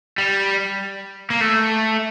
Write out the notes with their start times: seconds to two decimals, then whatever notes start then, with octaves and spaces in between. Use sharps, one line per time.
0.18 G3
1.30 A#3
1.41 A3